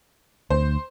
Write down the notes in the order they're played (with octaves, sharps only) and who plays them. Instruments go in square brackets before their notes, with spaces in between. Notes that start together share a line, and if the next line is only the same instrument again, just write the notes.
[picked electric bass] D2 [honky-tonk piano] C5